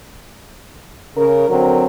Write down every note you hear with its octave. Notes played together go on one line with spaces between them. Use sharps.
C#3 A#4
D3 F#3 C4 A#4